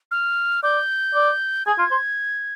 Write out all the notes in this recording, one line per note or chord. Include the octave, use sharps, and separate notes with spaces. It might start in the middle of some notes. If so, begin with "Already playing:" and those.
F6
D5 G6
D5
G#4 G#6
F4
C5